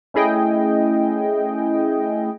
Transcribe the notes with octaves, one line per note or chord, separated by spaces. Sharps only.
A3 C#4 E4 G#4 D#5 G5